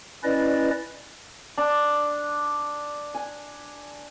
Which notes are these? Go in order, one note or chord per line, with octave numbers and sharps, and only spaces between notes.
C#4 E4 B4 D5 D#5
D4
G#5